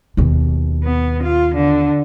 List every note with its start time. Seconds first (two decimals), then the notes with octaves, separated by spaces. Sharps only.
0.17 D#2 B2
0.84 B3
1.23 F4
1.55 D3